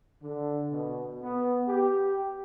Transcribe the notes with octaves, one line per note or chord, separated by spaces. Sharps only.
D3
B2
B3
G4